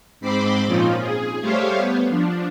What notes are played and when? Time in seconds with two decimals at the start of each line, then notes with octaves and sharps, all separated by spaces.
0.20 G#2 C4 C5 B5 C6 D6
0.66 A#2 F3 C4 C#4 D#4 F4
0.96 G#4
1.40 G3 A3 G4 C5 C#5 F5
1.77 B3
2.10 F3 D4